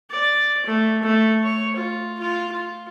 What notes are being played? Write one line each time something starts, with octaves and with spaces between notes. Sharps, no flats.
D5
A3
A3
C#5
F4
F4
F4